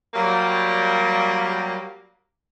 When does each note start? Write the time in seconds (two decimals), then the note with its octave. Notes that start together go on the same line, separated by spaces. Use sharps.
0.14 F#3 G3 A#3